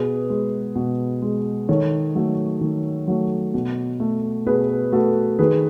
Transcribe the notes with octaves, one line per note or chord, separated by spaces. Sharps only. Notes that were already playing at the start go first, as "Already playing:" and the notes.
Already playing: B2 G#4 B4
G#3
B2
G#3
D#3 A4 C#5
F#3 A3
D#3
F#3 A3
B2
A3
B2 G#4 B4
A3 F#4 A4
D#3 G#4 B4